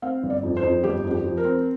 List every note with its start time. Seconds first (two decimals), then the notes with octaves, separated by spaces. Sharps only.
0.02 C4 F5
0.23 G1
0.30 D5
0.43 F2
0.57 C5
0.63 F2
0.84 G1 G4
1.04 F2
1.11 G4
1.24 F3
1.37 A#4
1.45 C4